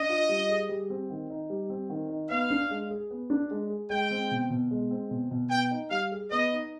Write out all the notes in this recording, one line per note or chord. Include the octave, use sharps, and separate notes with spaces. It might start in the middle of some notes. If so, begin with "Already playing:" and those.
Already playing: D4 D#5
F4
G3
G#4
G3
C4
D#3
D#4
G3
C4
D#3
D#4
B3 F5
D4
G#3
G#4
B3
D4
G#3
G#4
G#3 G5
C4
B2
B2
G#3
C4
B2
B2
B3 G5
D#4
G3 F5
G#4
B3 D#5
D#4